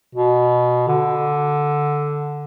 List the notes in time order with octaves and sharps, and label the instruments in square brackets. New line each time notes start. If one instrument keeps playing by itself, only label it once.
[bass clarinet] B2
D3